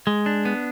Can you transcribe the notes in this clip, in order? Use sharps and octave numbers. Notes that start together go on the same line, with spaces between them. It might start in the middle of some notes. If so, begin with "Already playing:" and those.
G#3
D4
B3